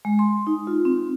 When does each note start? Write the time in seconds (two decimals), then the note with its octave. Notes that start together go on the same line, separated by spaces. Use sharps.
0.05 G#3
0.19 C6
0.47 D#4
0.67 F4
0.85 C4